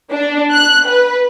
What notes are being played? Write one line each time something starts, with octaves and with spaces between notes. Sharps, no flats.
D4
F#6
B4